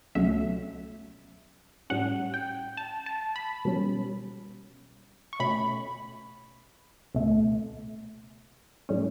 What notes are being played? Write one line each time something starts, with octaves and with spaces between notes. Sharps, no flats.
C#2 B2 F#3 A3 C#4 E5
A2 G3 C#4 F#5
G5
A5
A5
B5
B2 G3 C#4
C#6
B2 A3 C#4 B5
C#2 B2 A3
A2 G3 C#4